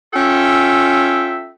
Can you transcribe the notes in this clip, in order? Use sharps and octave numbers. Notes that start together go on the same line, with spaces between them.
C#4 F4 A4 E5 G5